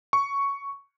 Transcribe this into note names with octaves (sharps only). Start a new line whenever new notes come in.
C#6